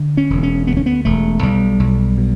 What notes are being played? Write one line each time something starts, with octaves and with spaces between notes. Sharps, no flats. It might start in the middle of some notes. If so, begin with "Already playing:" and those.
Already playing: D3
C#4
E1
C#4
D2 B3
C#4
B3
E1 A3
B1 G3
B1
B2